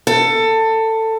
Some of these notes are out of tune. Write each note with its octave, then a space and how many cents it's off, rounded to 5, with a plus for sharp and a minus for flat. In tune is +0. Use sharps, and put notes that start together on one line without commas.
A4 +20